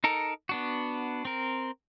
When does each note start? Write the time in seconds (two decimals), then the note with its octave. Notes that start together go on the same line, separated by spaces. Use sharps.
0.04 D#4 A4 A#4
0.49 B3 D4 F#4
1.25 C4 A#4